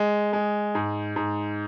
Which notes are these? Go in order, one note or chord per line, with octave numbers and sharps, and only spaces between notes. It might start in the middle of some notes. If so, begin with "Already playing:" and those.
Already playing: G#3
G#3
G#2
G#2